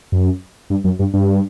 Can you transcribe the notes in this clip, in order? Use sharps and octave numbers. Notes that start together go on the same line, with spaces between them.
F#2
G2
F#2
G2
G2